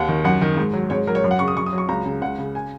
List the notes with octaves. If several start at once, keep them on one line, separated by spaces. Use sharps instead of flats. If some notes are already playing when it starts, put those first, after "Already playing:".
Already playing: D#2 F#5
D#3
F#2 F#5
D#3
G#2
F#3
G#2 C#5
F#3 A#4
C#5
F#2
F#5
C#3 C#6
D#6
F#2 C#6
D#6
F#3
C#6
C#2 A#5
C#3
C#2 F#5
C#3
G#5